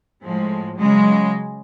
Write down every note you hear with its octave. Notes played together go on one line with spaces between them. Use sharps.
A2 F3 G#3
C#3 F#3 G#3